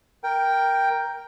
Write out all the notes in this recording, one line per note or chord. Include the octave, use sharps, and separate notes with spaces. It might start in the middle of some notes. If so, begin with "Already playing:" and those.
A#4 G5